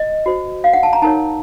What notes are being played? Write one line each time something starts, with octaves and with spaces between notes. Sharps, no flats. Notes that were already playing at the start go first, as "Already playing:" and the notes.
Already playing: D#5
F#4 C5
F5
F#5
A5
A#5
D#4 A#4 C#5 A5